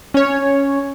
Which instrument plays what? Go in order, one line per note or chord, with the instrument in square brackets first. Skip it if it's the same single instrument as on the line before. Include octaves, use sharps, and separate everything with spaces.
[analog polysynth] C#4 C#5